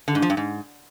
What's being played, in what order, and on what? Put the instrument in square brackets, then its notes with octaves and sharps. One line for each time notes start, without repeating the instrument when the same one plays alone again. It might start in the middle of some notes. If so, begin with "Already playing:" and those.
[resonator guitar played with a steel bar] D3
G#2
F3
G2
G#2